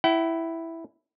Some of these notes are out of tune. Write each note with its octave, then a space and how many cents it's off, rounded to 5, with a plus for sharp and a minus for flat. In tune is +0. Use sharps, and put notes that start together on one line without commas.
E4 +0 F#5 +45